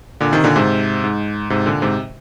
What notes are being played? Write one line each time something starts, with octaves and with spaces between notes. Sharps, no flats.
A#2 D3
C3 D#3
A#2 D3
G#2 C3
G#2
G#2 C3
A#2 D3
G#2 C3